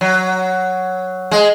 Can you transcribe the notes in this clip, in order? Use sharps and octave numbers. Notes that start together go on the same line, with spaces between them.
F#3
G#3